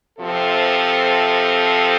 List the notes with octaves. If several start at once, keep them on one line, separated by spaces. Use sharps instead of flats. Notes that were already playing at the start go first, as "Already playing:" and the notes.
C3 F3 C4 A4